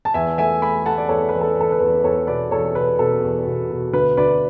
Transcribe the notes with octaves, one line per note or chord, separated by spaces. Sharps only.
A5
E2 E5 G#5
A3 E5 G#5
A3 G#5 B5
A3 F#5 A5
D5
E2 A4 C#5
E2 B4
A4
E2 A4
B4
E2
E2 A4 C#5
B2 B4 D5
E2 A4 C#5
B2 B4
B2 A4
E2
B2
B2
D2 B4
D2 B4 D5